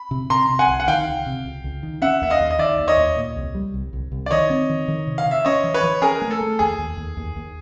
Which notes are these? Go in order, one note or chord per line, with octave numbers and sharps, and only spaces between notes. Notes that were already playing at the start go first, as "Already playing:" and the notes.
Already playing: B5
C3
C3 A#5 C6
C3
F#5 G#5
C2
F#5
D#3 F5 G5
C#2
C3
C#2
C#2
D#3
C#4 E5 F#5
D#2 E5
D#5 F5
D#2
D#5
D#3 D5 E5
D#2
C#5 D#5
D#2
A#2
C2
G3
C2
C2
C2
D5
D#3 C#5 D#5
C4
D#3
D#3
C3
F5
C3
E5
C#4 C#5 D#5
E3
B4 C#5
E3
C#4 G#4 A#4
A3
A4
A3
D#2 G#4
D#2
D#2
D#2
D#2